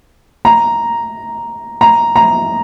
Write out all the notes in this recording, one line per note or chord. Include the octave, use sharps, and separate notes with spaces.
A#5
A#5
A#5